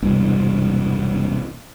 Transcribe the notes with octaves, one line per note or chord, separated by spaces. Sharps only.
E1 C2 G2